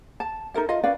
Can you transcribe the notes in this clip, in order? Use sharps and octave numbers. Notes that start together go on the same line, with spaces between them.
A5
D#4 A4 A#4 E5
F4 D#5 F5
C#4 B4 D5 F5